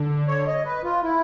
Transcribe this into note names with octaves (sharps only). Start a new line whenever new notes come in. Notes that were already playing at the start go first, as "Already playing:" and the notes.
Already playing: D3
C#5
D#5
B4
F4
E4